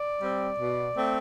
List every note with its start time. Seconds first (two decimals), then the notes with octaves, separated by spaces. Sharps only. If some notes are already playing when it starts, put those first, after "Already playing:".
Already playing: D5
0.19 G3 C4
0.57 B2
0.95 A3 C4